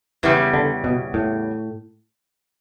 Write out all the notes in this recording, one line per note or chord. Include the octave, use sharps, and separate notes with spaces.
E2 C#3 E3 G3 B3
D3
B2
A2